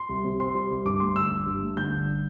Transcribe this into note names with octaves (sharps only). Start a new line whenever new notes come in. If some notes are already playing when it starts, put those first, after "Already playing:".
Already playing: C6
C2
C3
C4 C6
G3
C2
G2 D6
A3 C6
D3 E6
G1
G2
A3
D3 G6
G1